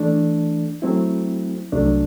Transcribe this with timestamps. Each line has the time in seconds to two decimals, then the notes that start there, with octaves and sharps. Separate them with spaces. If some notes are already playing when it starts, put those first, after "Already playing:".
Already playing: E3 A3 D4
0.82 F#3 A3 C4 E4
1.72 C2 C3 F#3 A3 D4